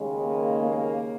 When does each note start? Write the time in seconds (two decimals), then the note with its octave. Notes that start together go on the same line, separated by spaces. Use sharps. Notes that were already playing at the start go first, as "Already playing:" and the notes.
Already playing: D#2 C#3 G#3
0.24 A#3
0.65 A#3